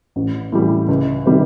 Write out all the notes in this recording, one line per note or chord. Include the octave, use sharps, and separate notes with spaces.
A1
A2 E3 G3
C#2
C3 D#3 G3 B3